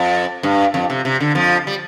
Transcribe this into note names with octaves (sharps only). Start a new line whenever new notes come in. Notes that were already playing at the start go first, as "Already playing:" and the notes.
Already playing: F2
G2
F2
C3
C3
D3
F2 F3
G3